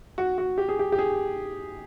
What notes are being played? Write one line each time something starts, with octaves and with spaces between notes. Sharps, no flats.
F#4
F#4
G4
G#4
G4
G4
G#4